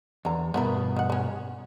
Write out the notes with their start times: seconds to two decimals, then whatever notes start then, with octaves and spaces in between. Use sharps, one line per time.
0.25 E2 D3 A#5
0.54 G2 B2 B3 E4 A#4
0.96 D#3 F#5
1.10 B3 C#4